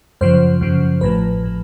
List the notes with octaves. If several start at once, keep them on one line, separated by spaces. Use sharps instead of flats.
F#2 C#3 F3 C5
F#2 C#3 F3
A1 A2 F3 B4
A2 F3